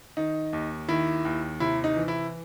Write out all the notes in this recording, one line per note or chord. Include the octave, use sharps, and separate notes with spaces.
D#3 D#4
D#2
D#3 E4
D#2
C3 E4
D#4
E3
E4